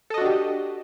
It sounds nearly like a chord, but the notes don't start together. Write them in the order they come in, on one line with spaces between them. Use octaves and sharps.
A4 D#5 F#4 D4 G4